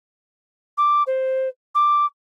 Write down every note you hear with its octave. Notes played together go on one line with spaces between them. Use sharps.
D6
C5
D6